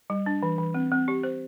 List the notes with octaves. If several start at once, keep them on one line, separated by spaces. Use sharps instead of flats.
G3
D4
E3
E3
C4
C4
G4
C5